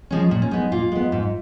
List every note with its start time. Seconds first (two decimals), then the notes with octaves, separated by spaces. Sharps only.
0.11 F3 G#3 C#4
0.31 A#2
0.42 C#4
0.51 G#3 B3 D#4
0.72 A#2 F4
0.92 G#3 B3
1.12 G#2